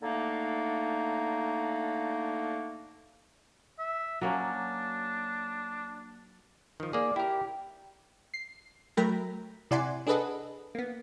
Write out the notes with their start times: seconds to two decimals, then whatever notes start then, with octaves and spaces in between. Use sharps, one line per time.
0.02 D3 A3 A#3 D#4
3.79 E5
4.21 F#3 A#3 C#4 D4
6.80 D#3 F3
6.93 A#3 G#4 D5
7.16 E4 G4 A#4
8.34 C7
8.97 F#3 A3 A#4 G5 A#5 B5
9.71 C3 E4 D5 F#5 G#5 C6
10.07 D4 G#4 A4 B4 D#5 F#5
10.75 A#3 B3